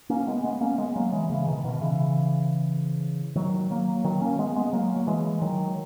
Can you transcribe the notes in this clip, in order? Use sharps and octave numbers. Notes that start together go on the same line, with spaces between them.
A#3 C#4
G#3 B3
G#3 B3
A#3 C#4
G#3 B3
F#3 A#3
E3 G#3
C#3 E3
B2 D#3
B2 D#3
C#3 E3
D#3 F#3
F#3 A#3
D#3 F#3
A#3 C#4
G#3 B3
G#3 B3
F#3 A#3
F#3
E3 G#3
D#3 F#3